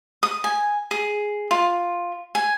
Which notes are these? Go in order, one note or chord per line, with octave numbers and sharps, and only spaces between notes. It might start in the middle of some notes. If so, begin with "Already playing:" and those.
D#6
G#5
G#4
F4
G#5